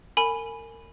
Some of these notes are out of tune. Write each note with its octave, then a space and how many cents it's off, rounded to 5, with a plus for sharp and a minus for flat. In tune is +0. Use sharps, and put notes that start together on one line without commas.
A#4 -30 G#5 +5 B5 +0